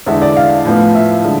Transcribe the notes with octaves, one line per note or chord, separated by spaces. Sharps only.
E2 D3 G#3 E5
D5
F5
A2 F3 B3
E5
D3 G#3